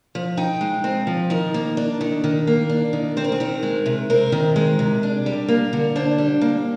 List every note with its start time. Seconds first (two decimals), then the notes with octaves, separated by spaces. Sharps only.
0.15 F3
0.37 D#4 G5
0.61 G#3
0.84 C4
1.07 F3
1.30 D#3 A#4
1.54 A#3
1.77 D4
2.01 D#3
2.24 D#3
2.47 A#3
2.69 D4
2.93 D#3
3.17 C4 C5
3.24 A#4
3.32 G#4
3.40 D#3 A#4
3.63 G#3
3.86 C3
4.10 C4 A#4
4.32 D#3
4.56 G#3
4.79 C3
5.03 D4
5.26 G3
5.48 A#3
5.73 D3
5.96 D4 C5
6.18 G3
6.41 A#3